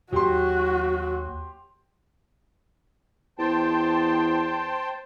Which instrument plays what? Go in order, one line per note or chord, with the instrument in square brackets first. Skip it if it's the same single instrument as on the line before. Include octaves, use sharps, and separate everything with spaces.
[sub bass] D#2 [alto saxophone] F#3 [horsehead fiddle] F#4 [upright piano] G4 C6
[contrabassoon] E2 [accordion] C5 G5 A5